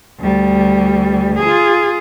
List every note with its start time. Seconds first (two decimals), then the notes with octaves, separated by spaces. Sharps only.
0.19 D2 G3
1.39 F4 G#4